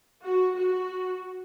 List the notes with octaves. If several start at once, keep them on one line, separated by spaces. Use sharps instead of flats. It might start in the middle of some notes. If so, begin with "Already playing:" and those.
F#4
F#4